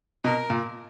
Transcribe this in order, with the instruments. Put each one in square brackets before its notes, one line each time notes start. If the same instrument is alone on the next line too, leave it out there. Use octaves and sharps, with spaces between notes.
[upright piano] B2 [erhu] A#4
[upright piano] A#2